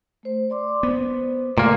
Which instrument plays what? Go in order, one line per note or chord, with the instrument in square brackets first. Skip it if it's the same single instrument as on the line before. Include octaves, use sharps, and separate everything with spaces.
[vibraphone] A3 C5
D5 C6 D6
[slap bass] B3 [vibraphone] C5
[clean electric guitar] A#2 A#3 [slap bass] C#3 A3